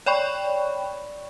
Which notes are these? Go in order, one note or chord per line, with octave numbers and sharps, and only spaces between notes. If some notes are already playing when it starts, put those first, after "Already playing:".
C#5 D5 G5 B5 C#6